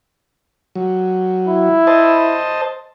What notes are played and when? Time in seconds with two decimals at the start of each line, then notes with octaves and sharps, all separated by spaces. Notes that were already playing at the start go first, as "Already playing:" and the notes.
0.75 F#3
1.48 E4
1.87 C5 D#5 A5